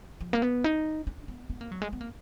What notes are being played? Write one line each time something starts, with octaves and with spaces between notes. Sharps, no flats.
F3
A#3
B3
D#4
D4
B3
B3
A#3
F#3
G#3
B3
A#3